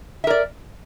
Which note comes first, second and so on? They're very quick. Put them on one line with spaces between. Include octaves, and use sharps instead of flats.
E5 A#4 D5